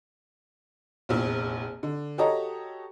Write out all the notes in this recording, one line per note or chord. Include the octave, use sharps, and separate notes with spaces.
F1 A#1 E2
D3
F#4 G4 A4 C#5 D#5 A#5